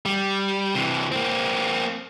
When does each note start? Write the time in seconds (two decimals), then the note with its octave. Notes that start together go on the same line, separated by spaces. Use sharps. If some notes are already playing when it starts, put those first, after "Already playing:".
0.06 G3
0.75 C3 E3
1.12 A#3 C4